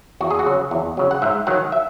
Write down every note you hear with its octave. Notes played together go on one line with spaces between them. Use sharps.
E2 F#4
G#4
F#4
C#3 F#3
E2
C#3 F#3
F#5
G#2 E5
D#3 F#3 F#5
E5